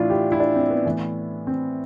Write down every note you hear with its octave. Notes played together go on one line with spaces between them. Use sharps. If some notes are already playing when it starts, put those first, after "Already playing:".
Already playing: A2 E3 D4 E4 F4
G4
E4
D4
C4
B3
A2 E3
C4